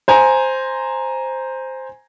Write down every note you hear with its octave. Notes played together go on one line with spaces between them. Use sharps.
C5 G#5 A#5